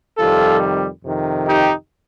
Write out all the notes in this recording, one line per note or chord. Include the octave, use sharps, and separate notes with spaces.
F2 C3 D#3 G3 F4 A4
F2 C3 D#3
D#4 G4